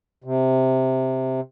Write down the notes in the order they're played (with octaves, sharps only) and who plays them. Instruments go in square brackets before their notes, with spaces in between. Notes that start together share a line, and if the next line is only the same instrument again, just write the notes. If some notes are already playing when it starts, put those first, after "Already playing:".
[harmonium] C3